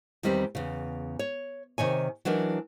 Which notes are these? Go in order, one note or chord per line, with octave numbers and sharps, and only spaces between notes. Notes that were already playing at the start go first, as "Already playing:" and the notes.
E2 D#3 G3 C4 B4
E2 C#3
C#5
C3 D#3 C#5 G#5
E3 F#3 D4 D#4 A#4